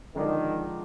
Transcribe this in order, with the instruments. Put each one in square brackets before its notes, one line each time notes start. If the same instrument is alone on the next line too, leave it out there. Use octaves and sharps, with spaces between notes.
[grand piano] D3 F3 G#3 D4 [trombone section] D#3